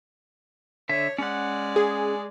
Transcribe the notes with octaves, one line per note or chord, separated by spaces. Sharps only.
D3 C#5 E5
G#3 C#4 D5 F#5
G#4